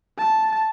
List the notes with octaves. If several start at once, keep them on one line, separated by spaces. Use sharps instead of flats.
A5